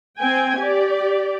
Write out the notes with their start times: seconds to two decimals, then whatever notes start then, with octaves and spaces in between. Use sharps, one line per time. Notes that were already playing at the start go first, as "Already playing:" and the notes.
0.19 C4 G5 G#5
0.58 G4 D5